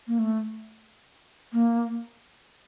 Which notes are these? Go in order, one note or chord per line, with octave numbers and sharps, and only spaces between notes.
A#3
A3
A#3